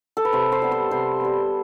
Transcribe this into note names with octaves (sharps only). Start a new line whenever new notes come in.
A4
B4
C3 C5
C5
G3 B3
C5
C3 C5
G3 B3